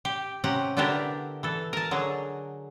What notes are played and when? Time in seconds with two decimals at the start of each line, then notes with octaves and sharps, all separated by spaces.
0.05 G4
0.44 C3 C#4 G4 F#5 A#5
0.77 D3 B3 D4 E4 G4 A#4
1.43 E3 A4
1.73 A#4 A5
1.91 D3 F#3 G#4